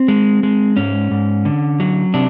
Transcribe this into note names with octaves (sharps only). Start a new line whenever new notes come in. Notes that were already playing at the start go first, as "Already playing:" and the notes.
Already playing: C4
G#3
G#3
G#2 C#4
G#2
D3
F#3
C3 D4